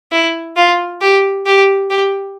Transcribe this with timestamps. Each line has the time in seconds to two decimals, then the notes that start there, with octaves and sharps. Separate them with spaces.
0.12 E4
0.57 F4
1.02 G4
1.46 G4
1.91 G4